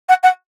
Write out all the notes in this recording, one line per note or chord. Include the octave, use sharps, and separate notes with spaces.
F#5
F#5